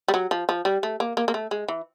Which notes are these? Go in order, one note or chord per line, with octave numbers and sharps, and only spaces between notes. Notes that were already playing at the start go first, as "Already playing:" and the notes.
G3
F#3
F3
F3
G3
A3
A#3
A#3
A#3
A3
G#3
E3